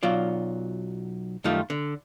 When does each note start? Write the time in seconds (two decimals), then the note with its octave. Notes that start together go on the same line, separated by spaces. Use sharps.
0.03 B1 F#3 F4 D5
1.44 F#2 D#3 G3 A3 F4
1.70 D3